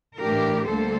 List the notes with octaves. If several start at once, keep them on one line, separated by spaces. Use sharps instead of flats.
A2 E3 A3 D4 G4 A#4
D2 D3 G3 A#3 A4 C5